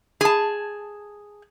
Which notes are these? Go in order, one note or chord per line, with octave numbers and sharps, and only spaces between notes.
G#4 A5